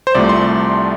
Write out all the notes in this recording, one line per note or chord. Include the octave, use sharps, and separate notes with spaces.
C5
C2 C3 F3 A3 D5
C6